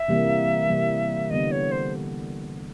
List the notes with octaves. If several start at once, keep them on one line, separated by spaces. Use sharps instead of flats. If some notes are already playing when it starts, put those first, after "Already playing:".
Already playing: E5
C3 E3 G3 A#3
C3 E3 G3 A#3
D3 G3 B3 D#5
C#5
C5